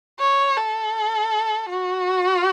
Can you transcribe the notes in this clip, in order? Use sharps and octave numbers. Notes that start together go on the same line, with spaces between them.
C#5
A4
F#4